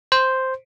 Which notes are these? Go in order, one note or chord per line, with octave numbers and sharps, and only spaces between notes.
C5